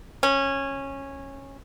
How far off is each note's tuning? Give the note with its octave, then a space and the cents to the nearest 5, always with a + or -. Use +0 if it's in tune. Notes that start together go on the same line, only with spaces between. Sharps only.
C#4 -15